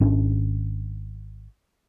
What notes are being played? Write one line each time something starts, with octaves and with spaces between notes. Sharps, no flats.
G#1 C#4 D4